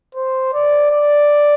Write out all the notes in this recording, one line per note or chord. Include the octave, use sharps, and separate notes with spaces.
C5
D5
D5